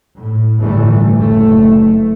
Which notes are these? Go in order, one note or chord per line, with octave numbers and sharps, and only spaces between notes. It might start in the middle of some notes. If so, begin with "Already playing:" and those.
A2
G1 A2 E3 G3 A3
F#1 A3